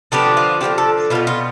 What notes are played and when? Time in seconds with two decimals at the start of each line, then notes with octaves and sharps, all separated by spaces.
0.12 D3 F3 B3 D4 G4
0.37 F4
0.61 D3 F3 B3 D4 G4
0.78 A4
1.10 B2 G3 B3 F4
1.27 F4